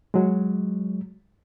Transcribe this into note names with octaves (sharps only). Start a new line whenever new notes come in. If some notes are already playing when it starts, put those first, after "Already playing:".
F#3 G#3